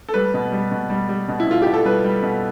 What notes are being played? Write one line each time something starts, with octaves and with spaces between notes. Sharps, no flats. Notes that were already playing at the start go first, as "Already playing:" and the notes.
A4
G3 B4
B2
G3
B2
G3
G3
B2
E4
B2 F4
B2 G4
A4
G3 B4
G3
B2